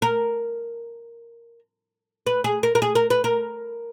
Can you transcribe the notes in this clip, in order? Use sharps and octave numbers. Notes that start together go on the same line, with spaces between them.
A#4
B4
G#4
A#4
A#4
G#4
A#4
B4
A#4